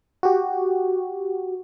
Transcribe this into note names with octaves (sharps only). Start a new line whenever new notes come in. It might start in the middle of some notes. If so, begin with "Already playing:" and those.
F#4 G4